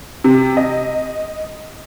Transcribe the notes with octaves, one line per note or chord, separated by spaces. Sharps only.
C3
D#5